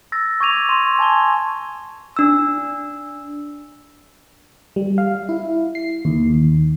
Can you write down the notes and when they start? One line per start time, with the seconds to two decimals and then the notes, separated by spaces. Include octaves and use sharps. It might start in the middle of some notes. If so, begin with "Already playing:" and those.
0.12 E6 A6 A#6
0.40 C#6 D6 G#6 D#7 F7
0.69 C6 D#7 E7
0.99 G#5 A5 G#6 G7
2.17 D4 E6
4.76 G3
4.98 F5
5.29 E4
5.75 C7
6.05 D#2